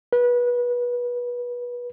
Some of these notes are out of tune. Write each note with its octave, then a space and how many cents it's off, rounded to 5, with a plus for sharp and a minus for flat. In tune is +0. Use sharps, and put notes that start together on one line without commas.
B4 -25